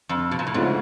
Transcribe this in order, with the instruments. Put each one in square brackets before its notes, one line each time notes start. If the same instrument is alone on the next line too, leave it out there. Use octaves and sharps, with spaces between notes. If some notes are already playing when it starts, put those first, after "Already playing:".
[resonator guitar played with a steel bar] F2
B2
A#2
A2
[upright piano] D2 C#3 F3 [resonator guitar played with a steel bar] G#2